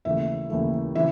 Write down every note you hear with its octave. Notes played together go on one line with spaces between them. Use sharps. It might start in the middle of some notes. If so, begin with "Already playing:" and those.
D#2 C#3 E3 A3 E5
D#2 C#3 E3 A3
C#3 E3 E5